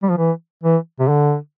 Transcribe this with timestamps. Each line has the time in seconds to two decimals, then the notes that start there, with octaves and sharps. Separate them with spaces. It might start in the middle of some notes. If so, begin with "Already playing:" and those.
0.03 G3
0.10 F3
0.18 E3
0.63 E3
0.99 C3
1.08 D3